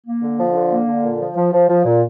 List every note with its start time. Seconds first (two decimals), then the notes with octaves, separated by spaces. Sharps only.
0.06 A#3
0.22 D3
0.39 F3
0.55 D3
0.72 A#3
0.88 D3
1.04 A#2
1.20 F3
1.37 F3
1.53 F3
1.70 F3
1.85 A#2